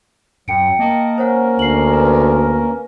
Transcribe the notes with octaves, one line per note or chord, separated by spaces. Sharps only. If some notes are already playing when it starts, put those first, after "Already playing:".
F#2 F#3 G5 C#7 D7
A#3 D#5 A5
C#4 A#4 C5 C#5 F#5
D2 C7 F#7
B4